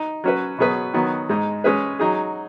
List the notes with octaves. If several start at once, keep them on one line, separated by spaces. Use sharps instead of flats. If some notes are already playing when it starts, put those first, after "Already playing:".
Already playing: D#4
F#3 C#4 F#4 B4
B2 F#3 B3 G#4 B4
D#3 F#3 B3
G#2 G#3 D#4
G#3 C#4 G#4 B4
F#3 D#4 G#4